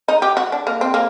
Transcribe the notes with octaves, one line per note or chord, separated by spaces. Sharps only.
D#4
G4
F#4
D4
A#3
C4
A#3